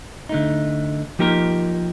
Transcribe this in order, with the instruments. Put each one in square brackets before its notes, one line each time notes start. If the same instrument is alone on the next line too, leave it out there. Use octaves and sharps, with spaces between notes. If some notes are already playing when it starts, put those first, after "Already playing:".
[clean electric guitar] D3 A3 D#4
F3 A#3 D#4 G4 A#4